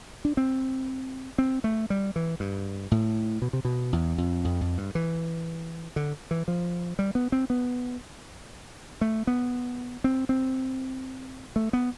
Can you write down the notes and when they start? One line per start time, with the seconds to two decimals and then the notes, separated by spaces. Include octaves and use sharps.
0.25 D4
0.37 C4
1.38 C4
1.64 A3
1.90 G3
2.16 E3
2.40 G2
2.91 A2
3.42 B2
3.53 C3
3.65 B2
3.93 E2
4.18 F2
4.45 F2
4.61 F2
4.78 G2
4.95 E3
5.96 D3
6.31 E3
6.48 F3
6.99 G3
7.15 B3
7.32 C4
7.50 B3
9.01 A3
9.27 B3
10.04 C4
10.29 C4
11.56 A3
11.73 B3